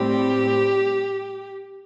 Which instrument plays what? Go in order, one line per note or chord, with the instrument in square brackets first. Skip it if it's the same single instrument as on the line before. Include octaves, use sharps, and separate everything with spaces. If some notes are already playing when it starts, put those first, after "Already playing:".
Already playing: [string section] A2 G3 C4 [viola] G4